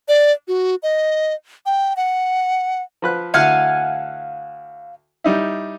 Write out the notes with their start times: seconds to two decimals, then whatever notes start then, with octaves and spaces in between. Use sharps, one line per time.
0.08 D5
0.48 F#4
0.83 D#5
1.66 G5
1.96 F#5
3.02 F3 B4 F#6
3.34 D2 E4 F5 F#5 G#5 F6
5.24 G3 D#4 E4